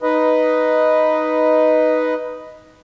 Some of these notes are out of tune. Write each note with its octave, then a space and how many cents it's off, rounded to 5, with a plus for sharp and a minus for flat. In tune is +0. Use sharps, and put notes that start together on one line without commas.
D#4 +0 B4 +0 D#5 +0